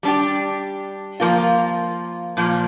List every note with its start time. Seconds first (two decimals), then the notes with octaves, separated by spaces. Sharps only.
0.03 G3 D4 G4
1.20 F3 A#3 F4
2.37 A#2 F3 A#3